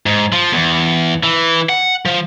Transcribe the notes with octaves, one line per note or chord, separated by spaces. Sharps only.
G#2
F3
E2
E3
F#5
F3